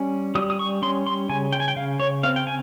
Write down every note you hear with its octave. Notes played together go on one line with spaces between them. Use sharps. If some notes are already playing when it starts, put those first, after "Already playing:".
Already playing: G3 C#4
G3 D#6
D#6
C#6
C#4 C6
C6
C#3 G#5
G5
G#5
G5
C#3 F5
C#5
C4 F5
G5
G#5